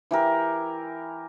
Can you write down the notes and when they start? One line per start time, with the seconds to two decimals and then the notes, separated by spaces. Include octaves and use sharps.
0.11 E3 G4 A#4